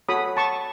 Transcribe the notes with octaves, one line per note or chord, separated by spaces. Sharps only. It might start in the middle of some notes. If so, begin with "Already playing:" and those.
F#4 A4 C#5 B5 D#6
A5 C#6